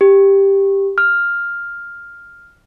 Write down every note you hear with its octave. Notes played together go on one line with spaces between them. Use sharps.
G4
F6